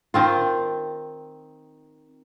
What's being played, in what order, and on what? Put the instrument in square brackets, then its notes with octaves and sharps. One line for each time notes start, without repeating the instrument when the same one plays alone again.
[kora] D#3 C4 F4